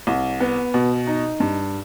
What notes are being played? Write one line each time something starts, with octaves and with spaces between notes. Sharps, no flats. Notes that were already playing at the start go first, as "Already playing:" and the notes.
C2
B3
B2
D#4
G2